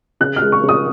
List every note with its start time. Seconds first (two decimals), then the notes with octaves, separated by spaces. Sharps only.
0.20 C#3 F#6
0.36 F6
0.42 G#3
0.52 C#6
0.63 C#3
0.69 D#6